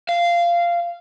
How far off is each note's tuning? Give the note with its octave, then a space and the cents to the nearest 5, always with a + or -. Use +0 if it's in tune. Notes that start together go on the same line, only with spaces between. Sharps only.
F5 -15